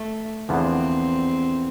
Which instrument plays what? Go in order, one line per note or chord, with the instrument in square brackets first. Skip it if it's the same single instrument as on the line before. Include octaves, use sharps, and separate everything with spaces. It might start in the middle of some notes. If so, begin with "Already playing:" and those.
Already playing: [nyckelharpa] A3
[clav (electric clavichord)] E2 D3 F3 B3 [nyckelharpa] C4